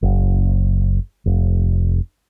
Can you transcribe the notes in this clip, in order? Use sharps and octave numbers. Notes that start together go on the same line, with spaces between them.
F#1
F1